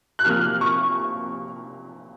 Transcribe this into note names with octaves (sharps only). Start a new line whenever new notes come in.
F#6
C3 F3 A#3 F6
C#6